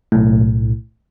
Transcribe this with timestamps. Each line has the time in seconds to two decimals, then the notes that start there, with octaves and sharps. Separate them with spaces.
0.12 B1 A2